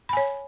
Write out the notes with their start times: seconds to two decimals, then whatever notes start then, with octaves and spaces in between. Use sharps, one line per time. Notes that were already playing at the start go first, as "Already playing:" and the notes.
0.09 B5
0.13 G#5
0.17 C#5